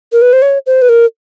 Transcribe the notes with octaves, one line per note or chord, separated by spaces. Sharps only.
A#4
B4
C5
C#5
C5
B4
A#4